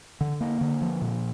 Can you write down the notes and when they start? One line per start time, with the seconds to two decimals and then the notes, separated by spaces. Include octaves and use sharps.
0.21 D3
0.41 A#3
0.61 D3
0.82 F3
1.02 A#2